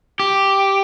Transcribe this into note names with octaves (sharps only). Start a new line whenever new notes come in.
G4